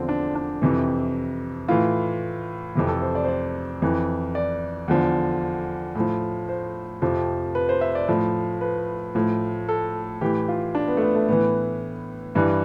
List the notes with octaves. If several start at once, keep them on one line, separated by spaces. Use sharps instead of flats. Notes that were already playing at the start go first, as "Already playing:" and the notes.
Already playing: E2 D3 F3 C4
D4
D4
F2 C3 E3
A2 E3 F4
F2 C3 E3
A4
C5
D5
C5
D5
F2 E3
D5
E2 D3 F3
A2 F3
C5
F2 C3 F3
B4
C5
E5
D5
A2 F3
B4
A2 F3
A4
A2 E3 G4
F4
D4
B3
A3
B3
A3
A2 E3 B3
G2 E3